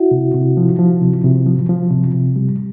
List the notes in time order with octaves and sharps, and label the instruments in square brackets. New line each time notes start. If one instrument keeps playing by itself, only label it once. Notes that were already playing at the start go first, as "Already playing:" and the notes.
Already playing: [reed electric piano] E4 F#4
C3
C3
F3
F3
C3
C3
F3
F3
C3
C3
G3